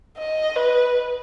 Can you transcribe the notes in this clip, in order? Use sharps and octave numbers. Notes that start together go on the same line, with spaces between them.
D#5
B4